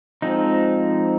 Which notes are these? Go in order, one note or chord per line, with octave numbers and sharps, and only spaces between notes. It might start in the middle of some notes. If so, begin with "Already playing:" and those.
F3 G#3 C4 D#4